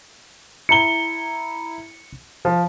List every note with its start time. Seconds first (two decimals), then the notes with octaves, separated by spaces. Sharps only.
0.69 E4 A#5 C#7 G7
2.45 F3